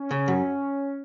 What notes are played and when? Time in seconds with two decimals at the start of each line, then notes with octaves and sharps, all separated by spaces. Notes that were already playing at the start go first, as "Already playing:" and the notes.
Already playing: C#4
0.11 C#3
0.28 F#2